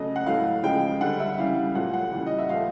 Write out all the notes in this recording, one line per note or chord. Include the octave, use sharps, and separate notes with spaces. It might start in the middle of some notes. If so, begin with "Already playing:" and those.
Already playing: C#3 F#3 A3 D#5
F#5
A2 F#3 A3 F5
C#3 F3 G#3 G5
D3 G3 F#5
E5
C#3 E3 G3 F5
A#2 F#3 A3 F#5
F#5
C#3 E3 G3
D#5
E5
A#2 F3 A3 F5